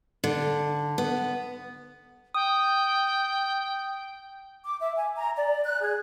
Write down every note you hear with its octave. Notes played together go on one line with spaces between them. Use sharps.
D3
B3
G5 D#6
D6
E5
G#5
A#5
D5
F#6
G#4